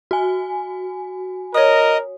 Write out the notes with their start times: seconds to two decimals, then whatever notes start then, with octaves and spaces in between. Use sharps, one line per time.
0.11 F#4 G#5
1.54 A#4 C#5 D#5 D#6